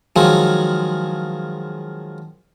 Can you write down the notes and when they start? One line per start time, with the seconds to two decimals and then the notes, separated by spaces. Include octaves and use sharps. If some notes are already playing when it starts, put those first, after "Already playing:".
0.16 D#3 F3 F#3 G#3